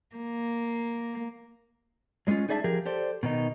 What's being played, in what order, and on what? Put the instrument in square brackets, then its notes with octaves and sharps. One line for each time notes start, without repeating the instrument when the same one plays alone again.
[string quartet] A#3
[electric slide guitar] F#3 G#3 B3 C#4 F4
D#4 G#4 D5 E5 G#5 A5
F3 G4 G#4 A#4
G4 A4 C5 D5
B2 D#3 D#4